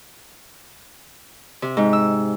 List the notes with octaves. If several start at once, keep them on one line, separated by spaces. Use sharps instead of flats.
C3
G#2
E6